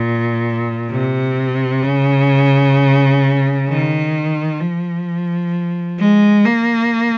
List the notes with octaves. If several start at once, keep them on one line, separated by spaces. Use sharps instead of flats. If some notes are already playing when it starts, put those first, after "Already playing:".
Already playing: A#2
C3
C#3
D#3
F3
G#3
A#3